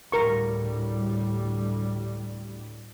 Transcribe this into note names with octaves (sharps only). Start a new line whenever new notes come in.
D2 A2 G3 A#4 C#6